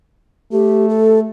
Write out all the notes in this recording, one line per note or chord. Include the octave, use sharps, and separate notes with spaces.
A3 G4
A4